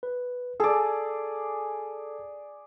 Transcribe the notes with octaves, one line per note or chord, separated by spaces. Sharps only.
B4
G#4 A4 D5